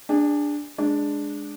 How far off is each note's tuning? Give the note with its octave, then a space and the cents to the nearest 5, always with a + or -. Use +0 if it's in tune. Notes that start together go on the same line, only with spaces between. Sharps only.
D4 +0 G#4 -30
G#3 +0 D4 +0 D5 +0